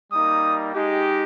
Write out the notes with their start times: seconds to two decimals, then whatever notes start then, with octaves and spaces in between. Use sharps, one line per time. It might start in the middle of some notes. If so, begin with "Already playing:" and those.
0.12 G3 A#3 D#4 D#6
0.74 G#3 D#4 G4